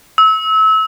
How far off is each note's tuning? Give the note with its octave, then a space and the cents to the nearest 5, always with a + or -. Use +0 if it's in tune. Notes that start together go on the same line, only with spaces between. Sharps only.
E6 -30